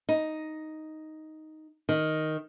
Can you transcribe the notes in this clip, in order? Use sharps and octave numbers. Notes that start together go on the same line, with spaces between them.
D#4
D#3